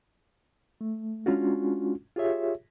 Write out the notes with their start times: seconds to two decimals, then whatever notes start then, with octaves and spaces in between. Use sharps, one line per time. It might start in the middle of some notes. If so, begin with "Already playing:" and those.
0.81 A3
1.26 G#3 C#4 D4 F4 F#4
2.16 F4 G4 G#4 C#5 E5